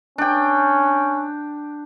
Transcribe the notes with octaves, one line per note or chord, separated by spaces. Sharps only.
C#4 D4 G5